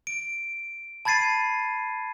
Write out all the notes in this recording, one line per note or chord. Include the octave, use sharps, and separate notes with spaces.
D7
A5 B5 G#6 A6 C7 D#7